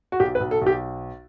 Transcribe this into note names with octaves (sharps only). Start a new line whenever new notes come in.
F#4
B1 G4
B4
B1
A4
B1 G4